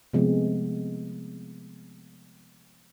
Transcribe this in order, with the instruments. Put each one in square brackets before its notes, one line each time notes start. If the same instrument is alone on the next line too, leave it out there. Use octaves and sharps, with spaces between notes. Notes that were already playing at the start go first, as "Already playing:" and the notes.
[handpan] C3 F3 G#3 A3 B3 C4